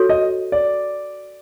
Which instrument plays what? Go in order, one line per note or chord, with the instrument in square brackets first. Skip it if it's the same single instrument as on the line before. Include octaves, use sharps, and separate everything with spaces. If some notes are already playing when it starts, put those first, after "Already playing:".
Already playing: [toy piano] F#4 A4 C#5
[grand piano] D#5
D5